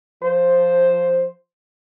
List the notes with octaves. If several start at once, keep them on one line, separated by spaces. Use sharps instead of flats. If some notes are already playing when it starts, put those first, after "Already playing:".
F3 C5